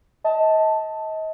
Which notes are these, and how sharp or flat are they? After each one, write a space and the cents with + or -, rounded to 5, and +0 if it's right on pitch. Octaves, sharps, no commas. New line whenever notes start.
D#5 +30 A5 +0